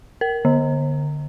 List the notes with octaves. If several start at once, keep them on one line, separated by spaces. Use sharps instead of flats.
A#4
D3